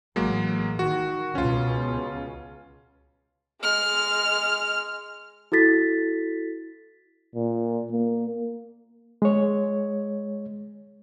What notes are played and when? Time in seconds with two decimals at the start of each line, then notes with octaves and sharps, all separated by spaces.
0.16 A1 F#3 G#3 A#3
0.79 D#3 F#4
1.35 C#2 B2 C#4 F4
3.61 G#3 F6
5.52 E4 F#4 A4 A6 B6
7.35 A#2
7.92 A#3
9.22 G#3 C#5